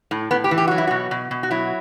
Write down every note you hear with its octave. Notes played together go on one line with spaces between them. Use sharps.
A2
A2 B3
G4
E3
G4
F#3 F#4
E4
B2 F#4
B2
B2
F#4
F#3 E4